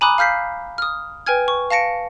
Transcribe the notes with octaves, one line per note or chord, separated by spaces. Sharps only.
G#5 A#5 B5 D6 D#6 F#6
F5 F6 G6 B6 C7
D#6 F6
B4 G5 G#5 F6 G#6
C#6
F5 A5 A#6 C#7 D7